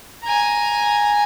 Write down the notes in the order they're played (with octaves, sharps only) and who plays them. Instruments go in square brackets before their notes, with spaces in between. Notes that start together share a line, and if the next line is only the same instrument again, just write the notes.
[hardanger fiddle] G#5 A#5